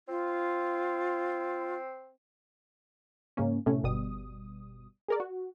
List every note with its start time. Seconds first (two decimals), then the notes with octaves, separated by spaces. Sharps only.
0.08 C4 F4
3.37 G#2 C#3 A#3 C#4
3.66 A2 C3 A3 C#4
3.83 G1 B2 G3 D#6
5.08 G#4 A#4 D5
5.20 F#4